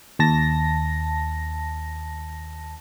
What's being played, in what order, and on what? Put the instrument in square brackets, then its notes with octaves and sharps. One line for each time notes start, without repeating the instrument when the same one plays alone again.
[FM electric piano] D#2 A5 A#6